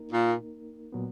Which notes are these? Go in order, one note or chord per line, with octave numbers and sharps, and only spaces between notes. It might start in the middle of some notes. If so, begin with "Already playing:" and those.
Already playing: A#3 D#4 A#4
A#2
A#2 F#3 B3